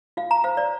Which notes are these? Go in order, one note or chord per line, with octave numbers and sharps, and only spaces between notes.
F4 F5
A#5
C5 F5
D5